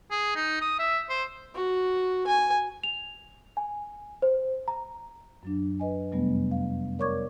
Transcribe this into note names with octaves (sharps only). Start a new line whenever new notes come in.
G#4
D#4
D#6
E5
C5
F#4
G#5
F7
G#5
C5
A#5
F#2 F#3 D4
B4 D#5 G#5
F2 C3 F#3 G3 A3 B3
F5
A#4 C#5 D5 C#6 D6 G#6